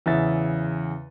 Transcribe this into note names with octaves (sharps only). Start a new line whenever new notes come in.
E2 C#3 E5 A6